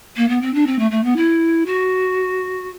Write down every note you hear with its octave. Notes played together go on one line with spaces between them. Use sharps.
A#3
B3
C4
D4
C4
A3
A3
B3
E4
F#4